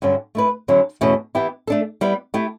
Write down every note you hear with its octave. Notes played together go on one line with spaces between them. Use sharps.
G2 D3 F#3 C#4 F#4
A3 E4 B4
E2 D3 F#3 C#4 E4
E2 B2 A3 C#4 F#4
E3 B3 E4 G4
A3 D4 A4
G3 B3 E4 B4
A3 E4 G4